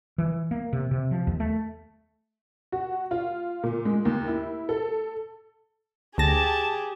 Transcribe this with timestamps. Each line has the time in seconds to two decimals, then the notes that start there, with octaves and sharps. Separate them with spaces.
0.18 E3
0.51 A#3
0.73 C3
0.91 C3
1.11 F3
1.27 D#2
1.40 A3
2.72 F#4
3.11 F4
3.63 A#2
3.85 G#3
4.05 D#2
4.28 E4
4.69 A4
6.18 D2 G4 G#4 A5 A#6